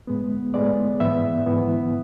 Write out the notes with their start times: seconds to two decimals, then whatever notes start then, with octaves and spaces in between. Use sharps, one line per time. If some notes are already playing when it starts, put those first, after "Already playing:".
0.07 A2 G#3 B3
0.54 A2 G#3 B3 D5
1.00 G#2 E3 B3 E5
1.47 G#2 E3 B3